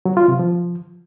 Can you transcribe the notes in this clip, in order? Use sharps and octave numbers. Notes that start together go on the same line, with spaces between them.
F#3
F4
C3
F3